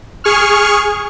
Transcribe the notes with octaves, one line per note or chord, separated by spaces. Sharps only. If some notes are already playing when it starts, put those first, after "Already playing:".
G#4 C#6 F6